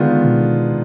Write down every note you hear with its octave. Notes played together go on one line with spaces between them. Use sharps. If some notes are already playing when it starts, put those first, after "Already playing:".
Already playing: D3 D#3 G#3 B3 D4 F4
B2